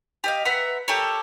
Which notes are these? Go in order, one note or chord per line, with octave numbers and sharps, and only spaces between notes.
G4 D#5 F5
B4 E5 F#5 A#5
G4 A4 A#4 C#5